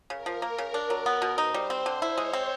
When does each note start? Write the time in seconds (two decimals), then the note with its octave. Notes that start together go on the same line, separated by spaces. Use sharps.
0.10 C#3 A#4
0.26 F3
0.42 A#3
0.58 C#3
0.74 D4
0.90 F#3
1.06 B3
1.22 B2
1.38 D#4 C5
1.54 G3
1.70 C4
1.86 D3
2.01 E4 C#5
2.18 G#3
2.33 C4